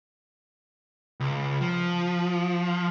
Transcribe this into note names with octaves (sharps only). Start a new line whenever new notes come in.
C#2
F3